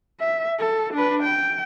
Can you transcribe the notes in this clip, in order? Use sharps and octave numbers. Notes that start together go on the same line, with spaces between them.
E5
A4
D4 B4
G5